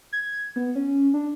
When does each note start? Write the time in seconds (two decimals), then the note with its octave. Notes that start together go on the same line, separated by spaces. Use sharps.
0.13 G#6
0.56 B3
0.75 C#4
1.14 D4